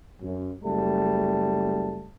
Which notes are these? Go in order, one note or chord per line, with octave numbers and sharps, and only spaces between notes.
F#2
F#1 G3 A3 A5